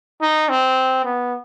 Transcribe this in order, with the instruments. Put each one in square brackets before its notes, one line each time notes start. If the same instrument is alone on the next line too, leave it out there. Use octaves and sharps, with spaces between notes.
[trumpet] D#4
C4
B3